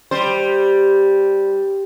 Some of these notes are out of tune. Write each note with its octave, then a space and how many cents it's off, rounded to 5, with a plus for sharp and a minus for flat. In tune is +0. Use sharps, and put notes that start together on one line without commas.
G3 +0 C5 +0